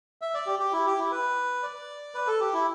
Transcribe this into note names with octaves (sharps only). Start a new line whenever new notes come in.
E5
D5
G4
G4
E4
G4
E4
B4
D5
B4
A4
G4
E4